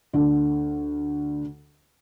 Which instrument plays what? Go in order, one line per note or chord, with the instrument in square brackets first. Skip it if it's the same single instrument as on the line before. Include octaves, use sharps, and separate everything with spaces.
[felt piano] D2 D3